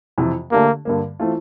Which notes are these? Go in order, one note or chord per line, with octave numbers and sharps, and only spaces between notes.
F2 C3 E3
D3 A3 A#3 D4 G4
G2 D3 G3 A#3
E3 A3 C4 F4